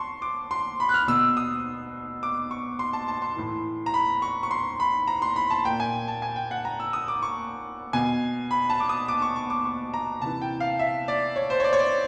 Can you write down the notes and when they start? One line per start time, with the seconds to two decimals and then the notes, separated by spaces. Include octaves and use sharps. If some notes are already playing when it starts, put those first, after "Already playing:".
Already playing: A5 C6 C#6
0.22 D6
0.51 C6
0.80 B5
0.89 F#6
0.94 F6
1.08 B2 E6
1.37 D#6
2.23 D6
2.51 C#6
2.79 C6
2.93 A5
3.08 A5
3.22 C6
3.36 A2 E3
3.86 A#5
3.94 B5
4.22 C#6
4.43 C#6
4.51 C6
4.80 B5
5.07 A#5
5.22 C6
5.36 B5
5.50 A5
5.65 A#2 G5
5.80 G#5
6.08 A5
6.22 G#5
6.36 G5
6.51 F#5
6.65 A#5
6.80 E6
6.93 D#6
7.08 D6
7.22 C#6
7.93 B2 G#5
8.51 B5
8.70 A5
8.80 D6
8.89 D#6
9.08 D6
9.22 C#6
9.36 C#6
9.50 D6
9.65 C#6
9.94 A#5
10.22 C3 E3 A5
10.41 G5
10.60 F5
10.79 E5
11.08 D5
11.36 C#5
11.50 C5
11.60 C#5
11.64 D5
11.73 C#5
11.79 D5